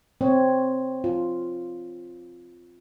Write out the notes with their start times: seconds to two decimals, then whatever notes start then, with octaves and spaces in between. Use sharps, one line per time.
0.21 C4 C#5
1.04 F4